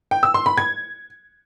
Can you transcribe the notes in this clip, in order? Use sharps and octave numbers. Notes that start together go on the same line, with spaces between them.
G5
E6
C6
B5
G#6